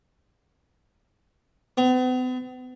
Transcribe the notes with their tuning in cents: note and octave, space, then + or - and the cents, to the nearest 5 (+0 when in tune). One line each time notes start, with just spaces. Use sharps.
B3 +45